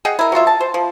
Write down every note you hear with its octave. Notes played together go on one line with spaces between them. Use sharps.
G#4 D#5 F#5 G5
E4 A#4
F#3 G#3 F4 E5
A5
C5
F3